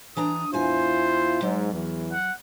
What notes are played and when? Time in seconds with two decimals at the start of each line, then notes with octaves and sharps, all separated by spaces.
0.17 E3 D4 A#5 D#6
0.54 E2 E4 F4 C5 G#5
1.42 G#2 F#3
1.72 E2 E3
2.12 F#5